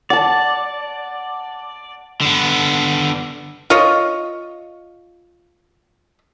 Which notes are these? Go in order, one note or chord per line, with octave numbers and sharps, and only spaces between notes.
D5 F#5 A5
D3 B3
F4 C#5 D#5